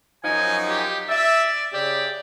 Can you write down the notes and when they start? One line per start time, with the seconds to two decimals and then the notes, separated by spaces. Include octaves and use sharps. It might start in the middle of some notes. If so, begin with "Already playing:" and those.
0.24 F#2 F3 D#4 G#5
0.69 G4
1.09 D5 E5
1.74 C#3 G4 D5